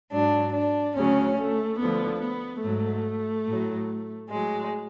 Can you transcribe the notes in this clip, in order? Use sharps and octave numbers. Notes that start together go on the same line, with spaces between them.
G#2 F#3 D4
D4
D2 C#3 F#3 C#4
A3
D2 D3 F3 B3
B3
G#2 F#3 A3
A2 F#3
A2 F#3 G#3